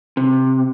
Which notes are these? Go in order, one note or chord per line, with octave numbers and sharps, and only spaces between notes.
C3